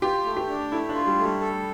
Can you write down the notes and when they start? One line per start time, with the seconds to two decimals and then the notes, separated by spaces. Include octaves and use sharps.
0.02 F4 G4
0.26 A3
0.37 G4
0.49 D4
0.71 A3 E4
0.89 D4 F4
1.07 G3
1.19 A3
1.24 G3
1.41 A4